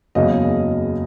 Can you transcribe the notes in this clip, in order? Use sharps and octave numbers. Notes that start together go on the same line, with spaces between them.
F#1 E2 C#3 F#3 D#5